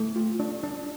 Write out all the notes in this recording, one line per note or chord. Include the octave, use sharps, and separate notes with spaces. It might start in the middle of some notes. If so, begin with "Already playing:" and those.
Already playing: A3
F4
D4
D4